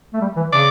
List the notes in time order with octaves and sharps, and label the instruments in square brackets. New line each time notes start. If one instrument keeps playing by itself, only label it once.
[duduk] A3
G3
E3
[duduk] C#3 [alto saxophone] D5